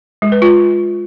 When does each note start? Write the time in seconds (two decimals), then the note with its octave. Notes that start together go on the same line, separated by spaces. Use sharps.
0.22 G#3
0.32 B4
0.42 F4